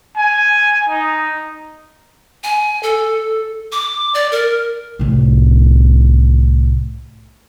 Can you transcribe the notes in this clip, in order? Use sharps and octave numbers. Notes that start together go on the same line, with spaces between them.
G#5
D#4
G#5
A4
D6
D5
A#4
C2 A2